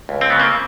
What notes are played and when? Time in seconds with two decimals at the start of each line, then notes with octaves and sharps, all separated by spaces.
0.09 C#2
0.21 C4
0.30 C#3 B3
0.40 A#3 C4